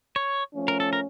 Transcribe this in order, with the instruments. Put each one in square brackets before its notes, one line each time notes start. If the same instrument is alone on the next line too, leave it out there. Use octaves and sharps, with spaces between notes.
[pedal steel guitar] C#5
[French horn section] F3 A3 C#4
[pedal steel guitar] A#4
A4
A#4